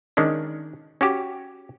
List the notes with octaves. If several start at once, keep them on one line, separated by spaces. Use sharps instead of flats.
D#3 G#3 C#4 D4
C#4 F#4 G4